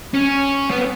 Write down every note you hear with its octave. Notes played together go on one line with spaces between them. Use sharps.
C#4
B3